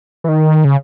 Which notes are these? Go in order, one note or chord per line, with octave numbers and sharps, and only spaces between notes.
E3
D#3
C#3